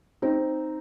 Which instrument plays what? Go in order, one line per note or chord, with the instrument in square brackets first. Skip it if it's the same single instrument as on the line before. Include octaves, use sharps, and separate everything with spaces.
[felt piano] C4 D#4